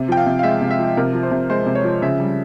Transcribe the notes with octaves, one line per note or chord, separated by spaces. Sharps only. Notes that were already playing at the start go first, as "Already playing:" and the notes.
Already playing: C3
F3 G5
F5
C3
F5
G#3 E5
C3
E5
F3
C3 A#4
F3
C5
C3
G#3 C5
C3
C#5
F3
C#3 E5
G3